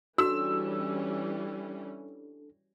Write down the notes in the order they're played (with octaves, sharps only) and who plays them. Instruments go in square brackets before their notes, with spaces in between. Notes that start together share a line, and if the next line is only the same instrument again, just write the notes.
[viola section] E3 G3 C#4 [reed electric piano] D4 A4 [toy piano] F#4 [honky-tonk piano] E6